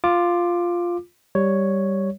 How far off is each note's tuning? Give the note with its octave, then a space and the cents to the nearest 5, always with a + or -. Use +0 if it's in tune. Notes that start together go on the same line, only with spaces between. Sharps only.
F4 +0 D6 +15
G3 +0 C#5 +0